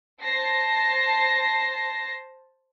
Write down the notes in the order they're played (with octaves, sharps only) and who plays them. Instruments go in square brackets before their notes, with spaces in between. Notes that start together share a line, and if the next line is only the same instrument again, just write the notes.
[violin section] C5 A5 A#6 C7